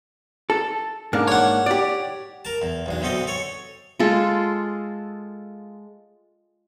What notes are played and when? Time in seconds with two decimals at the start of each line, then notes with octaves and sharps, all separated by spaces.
0.50 A4
1.13 G#2 A#3 D4
1.28 C#5 F#5
1.66 G4 D5
2.45 A#4 A5
2.62 E2
2.86 B1 E2 D4
3.01 D2 B2 B3 C4 A4 D#5
3.27 A4 C#5
3.99 G#3 F4 A4